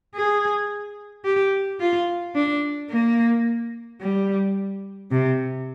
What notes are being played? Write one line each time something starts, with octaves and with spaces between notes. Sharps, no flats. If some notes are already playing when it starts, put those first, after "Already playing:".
G#4
G4
F4
D4
A#3
G3
C3